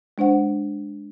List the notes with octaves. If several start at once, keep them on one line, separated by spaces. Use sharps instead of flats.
G#3 D4 C5 F#5